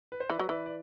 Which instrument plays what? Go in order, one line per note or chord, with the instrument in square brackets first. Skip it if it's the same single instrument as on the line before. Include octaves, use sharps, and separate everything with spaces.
[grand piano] B4
C5
[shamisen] E3 [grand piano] B4 D5
[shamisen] F#3
[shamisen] E3 [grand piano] B4 D5
[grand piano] D5